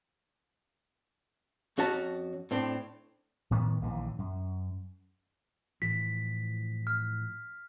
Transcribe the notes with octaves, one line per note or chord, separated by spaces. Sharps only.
F2 C#4 F#4 C#5 A5
A2 C4 D4
A2 D#3 F3 B3
A#1 D#2 C#3 E3
F#2
A2 E3 F3 B6
F6